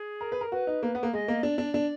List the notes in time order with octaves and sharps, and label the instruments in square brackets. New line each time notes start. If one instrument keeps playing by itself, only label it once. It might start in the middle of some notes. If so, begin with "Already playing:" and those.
Already playing: [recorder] G#4
[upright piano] A#4
B4
A#4
[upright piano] F#4 [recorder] B4
[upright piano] D#4
A#3
B3
A#3
[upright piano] G#3 [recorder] D#5
[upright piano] A#3
[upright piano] D4 [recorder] D5
[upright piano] D4
D4